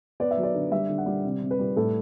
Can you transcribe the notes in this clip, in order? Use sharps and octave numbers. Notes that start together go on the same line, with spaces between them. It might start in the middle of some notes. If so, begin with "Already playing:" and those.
B3 D5
E5
F#3
D5
D3
G3 E5
D3
F#5
G3
C3
C3
B4
G3
A2 A4